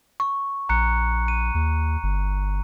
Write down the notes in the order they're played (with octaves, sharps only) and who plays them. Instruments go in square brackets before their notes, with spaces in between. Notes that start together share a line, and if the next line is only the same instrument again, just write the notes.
[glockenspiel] C#6
[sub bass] A#1 [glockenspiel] A#5 F#6 C#7
[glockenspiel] D#7
[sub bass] D#2
G1